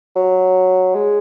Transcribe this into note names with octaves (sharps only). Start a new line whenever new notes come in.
F#3
G#3